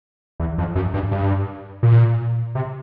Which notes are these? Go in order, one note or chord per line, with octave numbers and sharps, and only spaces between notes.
E2
F2
F#2
G2
G2
A#2
C3